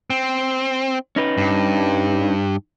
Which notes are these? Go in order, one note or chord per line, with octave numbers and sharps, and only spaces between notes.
C4
C#4 D#4 B4
G2